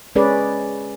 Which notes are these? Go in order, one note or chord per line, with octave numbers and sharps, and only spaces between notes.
G#3 C#4 G#4 B4 D5